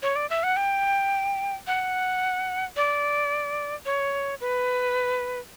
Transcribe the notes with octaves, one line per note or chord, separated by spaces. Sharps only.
C#5
D5
E5
F#5
G5
F#5
D5
C#5
B4